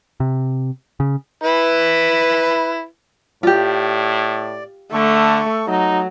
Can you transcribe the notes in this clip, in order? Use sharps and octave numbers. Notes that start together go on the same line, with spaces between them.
C3
C#3
E4 B4
A2 F4 G4 D5
D3 A3 A4 C#6
F#3 D#4